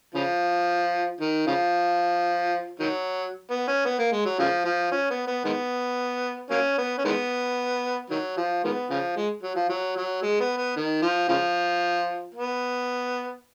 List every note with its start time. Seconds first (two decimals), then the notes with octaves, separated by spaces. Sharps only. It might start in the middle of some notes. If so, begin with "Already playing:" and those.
0.14 C#3 F3
1.21 D#3
1.47 C#3 F3
2.79 D#3 F#3
3.51 B3
3.67 C#4
3.85 B3
3.99 A#3
4.12 G#3
4.25 F#3
4.39 C#3 F3
4.65 F3
4.92 C#4
5.10 B3
5.27 B3
5.44 D#3 G#3 B3
6.50 F#3 A#3 C#4
6.78 B3
6.98 C#4
7.05 D#3 G#3 B3
8.10 D#3 F#3
8.36 F3
8.64 D#3 G#3 B3
8.90 C#3 F3
9.16 G#3
9.43 F#3
9.56 F3
9.70 F#3
9.96 F#3
10.22 G#3
10.40 B3
10.58 B3
10.76 D#3
11.02 F3
11.29 C#3 F3
12.35 B3